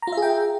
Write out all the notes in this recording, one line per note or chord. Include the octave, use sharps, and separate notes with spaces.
F4 G#4 E5 G5 A#5